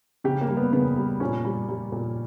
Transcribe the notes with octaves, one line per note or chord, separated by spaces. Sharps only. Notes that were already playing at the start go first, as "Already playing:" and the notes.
C#3 G4
A#3
G3
B3
C#3 B3
G3
A#2 C#4
G3
G3
A#2